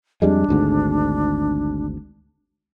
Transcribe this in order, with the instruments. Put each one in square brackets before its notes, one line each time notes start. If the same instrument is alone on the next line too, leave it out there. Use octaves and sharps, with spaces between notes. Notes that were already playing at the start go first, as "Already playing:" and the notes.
[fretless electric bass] F2 G3 G#3 [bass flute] D4
[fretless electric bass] G#1 D2 G#2